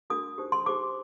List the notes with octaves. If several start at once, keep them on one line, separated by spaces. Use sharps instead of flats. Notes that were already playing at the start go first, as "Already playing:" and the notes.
D4 F#4 A#4 D#6
D#4 G4 C5
C6
D#4 G4 C5 D6